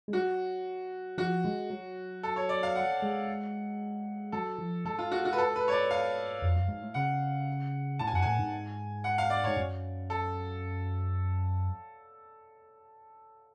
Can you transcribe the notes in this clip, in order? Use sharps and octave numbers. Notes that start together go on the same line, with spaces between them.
G#3
F#3 F#4
F3 F#4
G#3
F#3
A4
C#5
D5
F5
F#5
G#3
F#3 A4
F3
G#2 A4
F4
F#4
F#4
B4
A4
B4
C#5
D5
F5
F2
F#2
G#2
A2
C#3 F#5
A2 A5
G#5
F#2 F#5
A2 G#5
G#2
F#5
F5
D5
G#2 C#5
F#2
A4